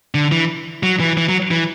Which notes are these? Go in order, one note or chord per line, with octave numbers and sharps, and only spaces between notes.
D3
E3
F#3
E3
E3
F#3
E3